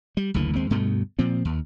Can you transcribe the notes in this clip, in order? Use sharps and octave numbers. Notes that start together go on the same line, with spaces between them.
G3
F#1 D2 D3 E3
D#2 G#3 C4
D2 G2 B2 A3
A#2 F3 C4
D#2